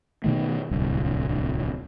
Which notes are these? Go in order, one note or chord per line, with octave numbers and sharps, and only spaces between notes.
B2 D#3 A3
D1 C2